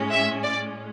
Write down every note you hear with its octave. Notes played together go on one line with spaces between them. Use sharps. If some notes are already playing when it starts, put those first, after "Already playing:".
Already playing: A2 G#3 C#4
E5
D5